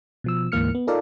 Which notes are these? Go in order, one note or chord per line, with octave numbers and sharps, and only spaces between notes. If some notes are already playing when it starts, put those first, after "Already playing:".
B2 F3 E6
D2 G#2 E3 A#3 F6 C#7
B3
D#4 F4 A4 A#4 D5 F5